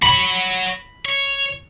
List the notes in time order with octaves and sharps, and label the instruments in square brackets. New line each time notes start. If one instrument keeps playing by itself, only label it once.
[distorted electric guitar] F#4 C#5 [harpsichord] B5
[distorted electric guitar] C#5